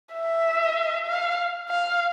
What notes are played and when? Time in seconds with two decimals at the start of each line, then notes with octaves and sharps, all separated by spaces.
0.13 E5
1.06 F5
1.69 F5